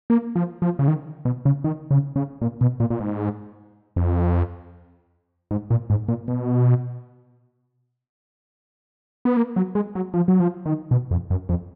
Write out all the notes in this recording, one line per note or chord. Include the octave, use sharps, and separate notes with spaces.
A#3
F3
F3
C#3
D#3
B2
C#3
D#3
C#3
C#3
A#2
B2
A#2
A#2
G#2
F2
G#2
A#2
G#2
A#2
B2
B3
A#3
F#3
G#3
F#3
F3
F#3
F3
D#3
B2
F2
F#2
F2